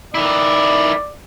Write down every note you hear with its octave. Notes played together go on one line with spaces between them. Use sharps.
D#3 E4 D5